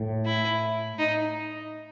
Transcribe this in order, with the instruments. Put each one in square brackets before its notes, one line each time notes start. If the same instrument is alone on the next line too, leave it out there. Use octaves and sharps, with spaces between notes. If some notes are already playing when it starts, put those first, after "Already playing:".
Already playing: [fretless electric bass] A2
[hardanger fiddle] E4
D#4